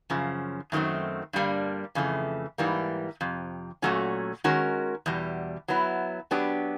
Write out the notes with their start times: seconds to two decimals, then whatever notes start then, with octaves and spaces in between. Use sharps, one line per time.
0.10 F#2 C#3 F3
0.72 F#2 D#3 F#3 A3 C4
1.33 G2 D3 G3 A#3 D4
1.95 F2 C#3 E3 A3
2.58 G#2 E3 G3 A#3
3.21 F2 C3
3.82 A#2 F#3 A3 C#4 F#4
4.44 D#3 G#3 C#4 F#4 A#4
5.06 E2 B2 G3
5.68 F#3 B3 E4
6.31 F#3 B3 D4 G4